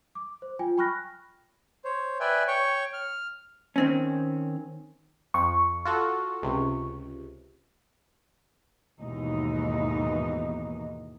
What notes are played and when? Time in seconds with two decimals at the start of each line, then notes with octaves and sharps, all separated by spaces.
0.15 D6
0.42 C5
0.59 F4 G5 G#5
0.78 G5 B5 C#6 F6 F#6 A#6
1.84 C5 C#5
2.20 B4 D5 E5 G5 G#5
2.48 C#5 G5 C#6
2.93 F6
3.76 D#3 C4 C#4
5.34 F2 C#6
5.85 F4 F#4 A4
6.42 C#2 C3
9.00 D#2 G#2 B2 E3 D#4